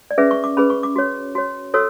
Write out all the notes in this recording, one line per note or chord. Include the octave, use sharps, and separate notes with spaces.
D5
C#4 G#4 B4 E5
C#6
D6
C#4 G#4 B4 B5
C#6
D6
F#4 C#5
F#4 C#5
F#4 A4 C#5 E6